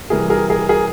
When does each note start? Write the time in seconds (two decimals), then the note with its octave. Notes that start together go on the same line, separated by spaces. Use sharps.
0.10 C3 E3 G3 G#4 A#4
0.30 G#4 A#4
0.50 G#4 A#4
0.69 G#4 A#4